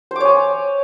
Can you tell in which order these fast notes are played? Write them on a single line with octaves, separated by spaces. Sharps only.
C5 D6 C#5 G#5